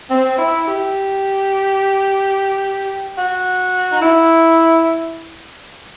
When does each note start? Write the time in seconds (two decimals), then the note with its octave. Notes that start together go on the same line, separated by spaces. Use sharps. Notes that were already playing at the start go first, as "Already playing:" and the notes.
0.09 C4
0.38 E4
0.66 G4
3.17 F#4
3.91 D#4
4.01 E4